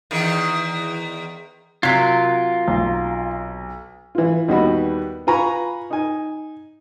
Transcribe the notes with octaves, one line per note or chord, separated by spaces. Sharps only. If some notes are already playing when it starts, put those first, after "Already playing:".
E2 D#3
C3 F#3 F4 A#4 G#6 B6
B1
E3 F4
D#2 G3 B3 F#4 D#5 B5
F4 B4 G#5 A#5 B5 C#6
D#4 G#5